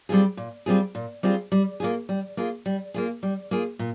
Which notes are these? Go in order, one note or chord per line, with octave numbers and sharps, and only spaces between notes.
G3 C4 F4 G#4
A#2
G3 C4 F4 G#4
A#2
G3 C4 F4 G#4
G3
A#3 F4 G#4
G3
A#3 F4 G#4
G3
A#3 F4 G#4
G3
A#3 F4 G#4
A#2